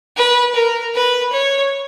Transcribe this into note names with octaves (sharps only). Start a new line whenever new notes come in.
B4
A#4
B4
C#5